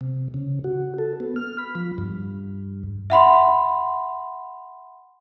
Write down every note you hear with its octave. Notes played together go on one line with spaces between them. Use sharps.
C3
C#3
F#4
A4
B3
F6
B5
F3
G2
E5 F#5 B5 C6